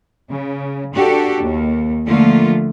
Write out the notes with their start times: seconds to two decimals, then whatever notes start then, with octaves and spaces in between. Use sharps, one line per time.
0.29 C#3
0.94 D4 F#4 G4 A4
1.42 D#2
2.06 D3 F3 A3 A#3 F4